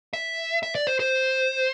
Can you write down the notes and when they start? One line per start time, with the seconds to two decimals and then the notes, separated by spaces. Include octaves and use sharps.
0.13 E5
0.63 E5
0.75 D5
0.87 C5
1.00 C5